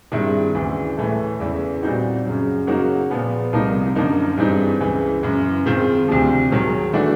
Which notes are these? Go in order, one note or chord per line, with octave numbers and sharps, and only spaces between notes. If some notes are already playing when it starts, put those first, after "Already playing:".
G2 D#3 G#3 C4 E4
D2 C#3 E3
A2 E3 A3
E2 C#3 E3
A#2 G3 C4 D#4 F#4
F#2 C#3 F#3
C#3 F#3 A#3 D#4 F#4
A#2 F3 G#3 B3
C2 C3 F3 A#3 D#4
F#2 D3 F3 A#3 D#4
G2 E3 G#3 C4 D#4
C#2 C#3 E3
F#2 C#3 E3 G#3
G#2 D#3 G#3 C4 F4
D2 C3 F3
G#2 D#3 F#3
E3 A3 D4 F#4